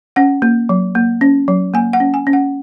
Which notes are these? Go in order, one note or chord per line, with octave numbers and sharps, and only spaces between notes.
C#4 F#5
A#3
F#3
A#3
C#4
F#3
A#3 G#5
F#5
C#4
G#5
C#4
F#5